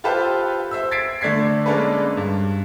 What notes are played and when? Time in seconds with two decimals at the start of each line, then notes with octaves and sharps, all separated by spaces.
0.04 F4 G4 A4 B4 C5
0.71 C5 E5 E6
0.91 G#6 A6 B6 C7 D7
1.21 D3 A3 D5 G#6 B6 C7
1.66 G#3 A#3 C#4 D4 A4 B4
2.17 G2